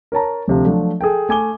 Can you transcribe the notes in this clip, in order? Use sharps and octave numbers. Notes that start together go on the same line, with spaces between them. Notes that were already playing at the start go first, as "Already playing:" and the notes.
A#4 C#5 A5 A#5
D2 C3 F3
F3 F#3 A3 D4
G#4 A4 G5
A3 G#5 D6 G7